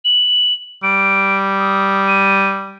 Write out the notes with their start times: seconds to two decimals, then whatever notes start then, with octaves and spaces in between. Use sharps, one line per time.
0.05 F#7
0.83 G3 D7
1.59 D#6
2.07 D#7